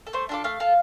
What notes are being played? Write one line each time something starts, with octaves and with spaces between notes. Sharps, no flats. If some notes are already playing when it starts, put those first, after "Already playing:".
A4
A3 C5
D4 F4 A4 D6
A3 F5
F4 A4